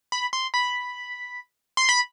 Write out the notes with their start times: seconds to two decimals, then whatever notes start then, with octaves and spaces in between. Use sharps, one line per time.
0.12 B5
0.33 C6
0.54 B5
1.77 C6
1.89 B5